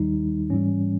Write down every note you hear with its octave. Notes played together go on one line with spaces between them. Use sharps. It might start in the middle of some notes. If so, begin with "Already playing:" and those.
Already playing: D#2 D#3 G3 D#4
G#2 E3 G3 C#4